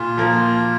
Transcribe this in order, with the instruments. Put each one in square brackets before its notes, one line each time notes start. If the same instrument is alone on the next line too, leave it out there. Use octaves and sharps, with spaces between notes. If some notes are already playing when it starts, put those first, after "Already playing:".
Already playing: [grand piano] A#2 [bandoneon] F4
[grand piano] F3 A#3